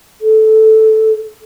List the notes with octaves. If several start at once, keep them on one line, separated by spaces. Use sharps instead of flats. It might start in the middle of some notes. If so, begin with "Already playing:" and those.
A4